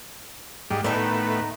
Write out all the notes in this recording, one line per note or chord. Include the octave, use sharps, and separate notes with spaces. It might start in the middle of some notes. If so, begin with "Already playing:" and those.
G#2 G3
A2 D#3 A3 B3 D#4